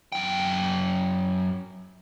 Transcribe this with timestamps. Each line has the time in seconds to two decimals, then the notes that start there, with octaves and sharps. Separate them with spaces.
0.12 F#2 G5